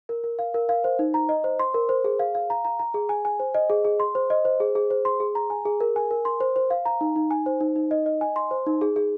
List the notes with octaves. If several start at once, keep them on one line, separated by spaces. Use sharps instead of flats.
A#4
A#4
F5
A#4
F5
C5
D#4
A#5
D#5
C5
C6
A#4
C5
G#4
F5
F5
A#5
A#5
A#5
G#4
G#5
G#5
C5
D#5
G#4
G#4
C6
C5
D#5
C5
G#4
G#4
C5
C6
G#4
A#5
G#5
G#4
A#4
G#5
A#4
C6
C5
C5
F5
A#5
D#4
D#4
G#5
C5
D#4
D#4
D#5
D#5
G#5
C6
C5
D#4
G#4
G#4